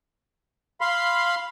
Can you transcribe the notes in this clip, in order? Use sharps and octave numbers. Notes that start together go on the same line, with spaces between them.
F5 B5 C6